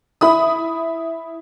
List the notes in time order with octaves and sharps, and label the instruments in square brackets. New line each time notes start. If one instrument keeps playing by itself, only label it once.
[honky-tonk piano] E4 B5 D#6